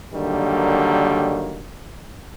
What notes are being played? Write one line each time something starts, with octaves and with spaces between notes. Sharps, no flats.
D3 D#3 F#3 G3 A#3